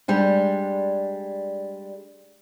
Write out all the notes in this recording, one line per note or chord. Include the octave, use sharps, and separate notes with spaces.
G3 G#3 D4